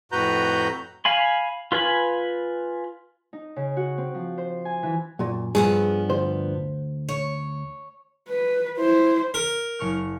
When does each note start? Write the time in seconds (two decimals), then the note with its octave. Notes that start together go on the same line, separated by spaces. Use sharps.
0.12 F2 A2 F#4 B4 A#5 G6
1.05 F5 G#5 B5
1.72 F4 B4 G#5 B5
3.33 D#4
3.56 C#3
3.77 F#4
3.98 C4
4.14 F3
4.38 C5
4.65 G#5
4.83 E3
5.19 F#2 A#2
5.55 G2 F3 B3 G#4
6.09 D2 C5
7.09 C#5
8.28 B4
8.78 E4 C5
9.34 A#4
9.79 F#1 C#6 F6